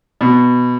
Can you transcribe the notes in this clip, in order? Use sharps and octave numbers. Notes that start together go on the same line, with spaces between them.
B2